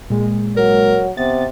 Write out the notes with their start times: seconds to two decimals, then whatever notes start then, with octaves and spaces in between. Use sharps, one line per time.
0.10 A#2 G#3
0.57 F#3 A#4
1.17 C3 B3 A6